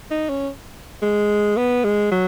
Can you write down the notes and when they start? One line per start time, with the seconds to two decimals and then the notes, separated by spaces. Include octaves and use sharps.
0.11 D#4
0.29 C#4
1.02 G#3
1.57 B3
1.84 G#3
2.11 F#3